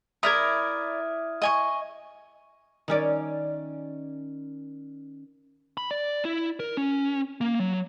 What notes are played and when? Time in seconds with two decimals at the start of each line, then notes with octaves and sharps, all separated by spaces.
0.23 E4 A#4 D5 A#5 D#6 F6 G#6
1.42 D#5 G#5 C#6
2.88 D#3 C#4 D5
5.77 B5
5.91 D5
6.25 E4
6.60 A#4
6.77 C#4
7.41 A#3
7.60 F#3